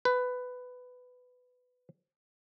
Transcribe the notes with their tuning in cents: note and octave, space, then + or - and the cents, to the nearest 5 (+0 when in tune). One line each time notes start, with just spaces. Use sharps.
B4 +15